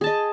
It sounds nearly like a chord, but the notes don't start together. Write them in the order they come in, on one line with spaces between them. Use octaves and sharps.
G#4 A5 D#5